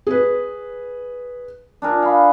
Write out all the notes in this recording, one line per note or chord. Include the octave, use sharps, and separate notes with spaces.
G#4 B4
D4 G#4 A#4
F5 B5